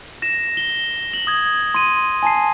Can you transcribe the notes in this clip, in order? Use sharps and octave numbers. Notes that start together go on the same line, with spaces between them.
A#6 E7
G7
F#7
D#6 G#6
C6 D#7
G#5 A5 C7